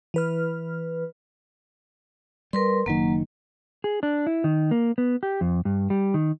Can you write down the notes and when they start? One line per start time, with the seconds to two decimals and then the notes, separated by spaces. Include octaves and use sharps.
0.14 E3 B4 F6
2.53 G3 A#4 B4 C6
2.86 F#1 D#3 F#3 A#3
3.84 G#4
4.03 D4
4.27 E4
4.44 D#3
4.71 A#3
4.98 B3
5.23 G4
5.41 F2
5.65 G2
5.90 G3
6.14 D#3